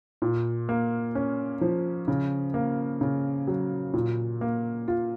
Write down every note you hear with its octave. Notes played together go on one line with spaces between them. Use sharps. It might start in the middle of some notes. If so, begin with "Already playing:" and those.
A#2
A#3
C#4
F3
C#3
A#3
C#3
F#3
A#2
A#3
F4